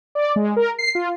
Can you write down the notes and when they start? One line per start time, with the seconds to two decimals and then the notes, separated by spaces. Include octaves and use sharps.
0.15 D5
0.36 G#3
0.56 A#4
0.79 C7
0.95 F4